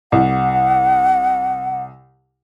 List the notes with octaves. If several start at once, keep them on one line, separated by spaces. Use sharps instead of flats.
C2 F#5